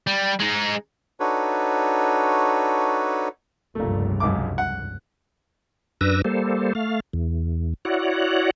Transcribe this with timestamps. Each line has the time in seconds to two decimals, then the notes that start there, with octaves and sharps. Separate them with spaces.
0.07 G3
0.40 G#3 D#4
1.20 D4 D#4 F#4 A4 B4 C#5
3.75 F1 C#2 G2 A#2 A3
4.20 B1 G#2 D6
4.58 F#5
6.01 F#2 D4 B4 E6 A#6
6.25 G3 A#3 A4 C5
6.75 A3 F5
7.13 E2
7.85 E4 F#4 C#5 D5 F#5